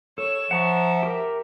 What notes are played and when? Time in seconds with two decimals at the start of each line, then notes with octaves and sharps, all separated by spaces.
0.18 A4 C#5 E7
0.51 F3 E5 F#5 A#5 C#6
1.03 G4 A#4